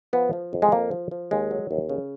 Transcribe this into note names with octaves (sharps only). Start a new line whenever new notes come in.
F3 B3
F3
F2
G#3
F2 A#3
F3
F3
D#2 G#3
F#3
D#2
C#3